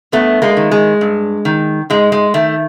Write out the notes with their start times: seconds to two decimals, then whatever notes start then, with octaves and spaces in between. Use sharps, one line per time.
0.12 G2 A3 B3
0.42 G#3 A#3
0.57 D#3
0.71 G#3
1.01 G2
1.45 D#3
1.90 G#2 G#3
2.12 G#3
2.34 D#3 A3